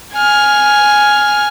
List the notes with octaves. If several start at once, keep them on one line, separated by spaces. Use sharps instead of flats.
G#5 F6